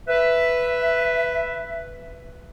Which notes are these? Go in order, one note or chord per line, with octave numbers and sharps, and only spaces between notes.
B4 E5